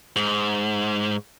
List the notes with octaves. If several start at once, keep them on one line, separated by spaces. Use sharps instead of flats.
G#2